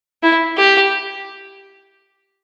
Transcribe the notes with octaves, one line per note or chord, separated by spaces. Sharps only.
E4
G4